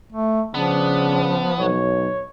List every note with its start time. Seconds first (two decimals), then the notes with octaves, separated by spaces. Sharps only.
0.13 A3
0.55 C#3 F3 B3 D4
1.59 B1 C#5